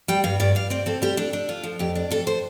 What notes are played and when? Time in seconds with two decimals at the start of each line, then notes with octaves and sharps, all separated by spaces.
0.08 G3 G5
0.24 G2 F5
0.40 G2 D5
0.55 G2 F5
0.70 C4 D5
0.86 C4 A4
1.02 G3 G4
1.17 D4 A4
1.33 D4
1.49 F4
1.63 F3
1.79 F2 G4
1.95 D4
2.11 F2 A4
2.27 C5